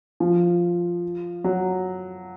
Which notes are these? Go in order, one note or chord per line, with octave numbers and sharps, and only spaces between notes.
F3
F#3